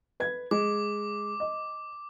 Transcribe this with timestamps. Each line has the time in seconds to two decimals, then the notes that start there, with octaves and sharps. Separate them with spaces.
0.20 B4 G#6
0.51 G#3 D6
1.40 D#5